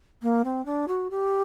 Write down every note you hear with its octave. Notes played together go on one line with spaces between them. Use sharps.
A#3
C4
D4
F#4
G4